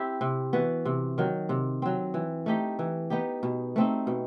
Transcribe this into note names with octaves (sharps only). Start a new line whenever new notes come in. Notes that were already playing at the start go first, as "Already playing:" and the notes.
Already playing: C4 E4 G4
C3
E3 B3 F#4
C3
D#3 F#3
C3
F#3 C4
E3
A3 D#4 G4
E3
B3 D#4 G4
B2
A3 C4 D#4
B2